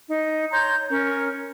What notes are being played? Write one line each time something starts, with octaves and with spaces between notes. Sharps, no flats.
D#4
C#5 A#5 C6 G6
C#4 A#4